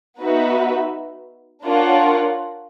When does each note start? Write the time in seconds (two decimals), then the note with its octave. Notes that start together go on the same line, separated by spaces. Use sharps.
0.21 B3 D#4 F#4 B4 E5
1.65 D4 F4 A#4 C#5 F#5